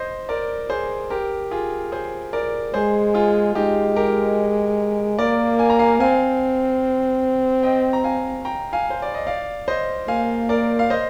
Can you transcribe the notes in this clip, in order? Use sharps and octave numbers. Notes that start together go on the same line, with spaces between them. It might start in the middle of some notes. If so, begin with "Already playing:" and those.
Already playing: C5 D#5
A#4 D5
G#4 C5
G4 A#4
F4 G#4
G#4 C5
A#4 D5
G#3 G#4 C5
F4 G#4
G#3 D#4 G4
G4 A#4
A#3 A#4 D5
G#5
A#5
F5 G#5
C4 F5 G#5
D#5 G5
A#5
F5 G#5
G5 A#5
F5 G#5
C5
D5
D#5
D5 F5
C5 D#5
A#3 F5 G#5
A#4 D5
F5
C5 D#5